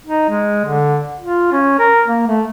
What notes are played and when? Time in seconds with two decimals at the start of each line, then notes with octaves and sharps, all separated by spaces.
0.06 D#4
0.29 G#3
0.65 D3
1.20 F4
1.52 C#4
1.79 A#4
2.07 A#3
2.27 A3